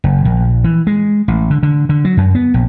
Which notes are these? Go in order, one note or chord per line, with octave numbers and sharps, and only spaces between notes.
F#1
A#1
E3
G#3
A1
D3
D3
D3
F#3
F#2
B3
A#1